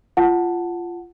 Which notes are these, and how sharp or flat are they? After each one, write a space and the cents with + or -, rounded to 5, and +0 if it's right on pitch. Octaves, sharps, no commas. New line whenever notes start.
F4 -15 F#5 +0 A5 +0